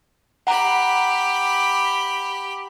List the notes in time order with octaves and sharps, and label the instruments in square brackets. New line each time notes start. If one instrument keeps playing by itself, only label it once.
[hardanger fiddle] G4 B5 [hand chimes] F#5 A#5